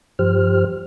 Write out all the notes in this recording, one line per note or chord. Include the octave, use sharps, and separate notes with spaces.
G2 F3 G4 C5 F6